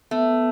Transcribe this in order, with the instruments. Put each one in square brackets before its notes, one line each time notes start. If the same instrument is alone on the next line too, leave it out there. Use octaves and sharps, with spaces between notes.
[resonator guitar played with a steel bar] A3 [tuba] B3